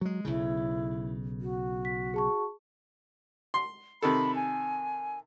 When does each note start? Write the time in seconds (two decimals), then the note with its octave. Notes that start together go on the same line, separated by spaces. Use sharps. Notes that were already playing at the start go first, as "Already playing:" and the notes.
0.01 F#3 G#3
0.25 B1 C#3 E4
1.41 F#4
1.85 B6
2.14 G#4 A5 C#6
3.54 C6
4.02 C3 D#3 A4 B5
4.36 G#5